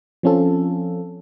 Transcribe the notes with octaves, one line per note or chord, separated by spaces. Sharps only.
F3 C4 C#4 F4 A4